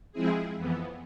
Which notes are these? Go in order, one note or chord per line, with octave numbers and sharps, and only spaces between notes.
F3 G#3 C4 E4 G#4
F2 E3 B3